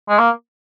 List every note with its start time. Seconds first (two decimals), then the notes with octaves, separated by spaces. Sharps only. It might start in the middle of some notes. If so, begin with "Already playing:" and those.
0.09 G#3
0.18 A#3